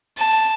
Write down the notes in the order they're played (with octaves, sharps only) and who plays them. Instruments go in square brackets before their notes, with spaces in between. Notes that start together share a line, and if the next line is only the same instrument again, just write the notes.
[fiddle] A5